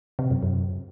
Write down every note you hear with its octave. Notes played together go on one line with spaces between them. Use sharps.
C3
F#2
F#2